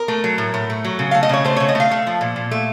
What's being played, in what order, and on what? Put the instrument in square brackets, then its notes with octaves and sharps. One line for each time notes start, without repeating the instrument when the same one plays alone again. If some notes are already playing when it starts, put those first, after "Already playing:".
Already playing: [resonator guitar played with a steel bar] A#4
A3
F#3
A2
A2
A3
F#3
C#3
A3 F5
D#5
C#3 C#5
A3 C5
C#5
C#3
D#5
A3 F5
A3
F3
A#2
A#2
A3